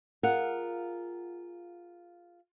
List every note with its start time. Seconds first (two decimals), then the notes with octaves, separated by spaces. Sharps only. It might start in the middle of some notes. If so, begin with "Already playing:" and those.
0.23 F4 G#4 A#4 F5 F#5